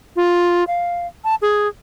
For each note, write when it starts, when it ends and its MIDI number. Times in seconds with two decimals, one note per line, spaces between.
0.16 0.64 65
0.67 1.07 77
1.24 1.35 81
1.42 1.68 68